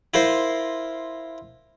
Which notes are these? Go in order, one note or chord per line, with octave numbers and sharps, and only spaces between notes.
E4 F4 A#4 C5